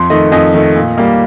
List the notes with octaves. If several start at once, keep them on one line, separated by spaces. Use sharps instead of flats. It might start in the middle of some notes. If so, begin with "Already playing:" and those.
Already playing: F2 C6
D#3 A3 D#5
F2 D#5
D#3 A3
A#2
G3 A#3